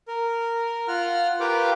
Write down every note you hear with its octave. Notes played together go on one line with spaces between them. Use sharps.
A#4
F4 F#5 F6
F4 G4 A#4 B4 G5 D6